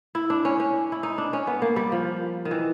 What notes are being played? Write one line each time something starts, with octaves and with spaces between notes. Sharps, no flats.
E4
D4
C#4
C#4
E4
D#4
D4
C#4
B3
A#3
G3
F3
D#3
E3